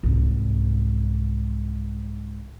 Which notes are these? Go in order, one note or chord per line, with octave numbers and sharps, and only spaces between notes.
C2 G#2